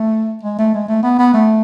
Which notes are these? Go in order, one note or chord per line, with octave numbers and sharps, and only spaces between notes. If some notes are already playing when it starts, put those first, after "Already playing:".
Already playing: A3
G#3
A3
G#3
A3
B3
B3
A3